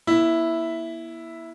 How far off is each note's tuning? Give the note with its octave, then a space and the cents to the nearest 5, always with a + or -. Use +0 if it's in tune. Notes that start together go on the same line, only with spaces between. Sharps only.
A#3 +45 E4 +0 E5 +0